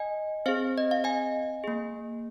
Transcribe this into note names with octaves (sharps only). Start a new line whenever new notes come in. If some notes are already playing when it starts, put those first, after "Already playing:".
Already playing: D#5 G#5
C4 G#4 C5 F5
D#5
F5
D#5 G#5
A#3 G#4